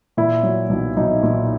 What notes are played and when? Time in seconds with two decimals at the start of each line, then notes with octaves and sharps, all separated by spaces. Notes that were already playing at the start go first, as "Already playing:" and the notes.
0.17 A#2 E4
0.43 F#3
0.69 B1
0.96 B1 D#4
1.23 A#2